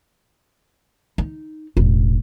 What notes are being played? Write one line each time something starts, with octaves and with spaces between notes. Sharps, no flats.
D#4
E1 A1